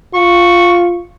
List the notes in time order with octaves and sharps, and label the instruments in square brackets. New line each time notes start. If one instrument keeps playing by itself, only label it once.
[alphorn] F4 [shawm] C#6